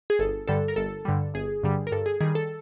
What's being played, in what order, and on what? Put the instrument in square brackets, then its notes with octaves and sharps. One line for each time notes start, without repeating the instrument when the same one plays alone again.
[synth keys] G#4
G1 A4
G2 D3 G3 A4
A#4
G1 A4
G2 D3 G3
G1 G#4
G2 D3 G3
A#4
G2 A4
G#4
D#3 G3 G#4
A4